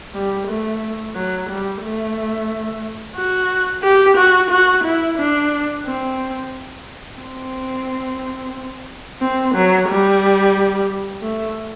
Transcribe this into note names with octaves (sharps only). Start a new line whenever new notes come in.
G3
A3
F#3
G3
A3
F#4
G4
F#4
F#4
E4
D4
C4
C4
C4
F#3
G3
A3